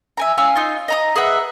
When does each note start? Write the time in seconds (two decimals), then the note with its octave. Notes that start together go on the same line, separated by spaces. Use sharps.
0.17 E5 G#5 A#5
0.38 C#4 F5 G#5 E6
0.56 D#4 F4
0.88 D#5 A#5 D#6
1.16 G#4 B4 E5 F#5